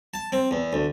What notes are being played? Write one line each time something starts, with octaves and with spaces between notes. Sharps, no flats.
A5
C4
E2
D2